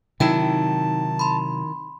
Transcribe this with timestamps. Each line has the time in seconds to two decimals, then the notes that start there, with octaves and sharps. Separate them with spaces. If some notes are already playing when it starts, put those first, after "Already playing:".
0.20 C3 D#3 F#3 D#4 E4 G5 A5
1.19 B5 C6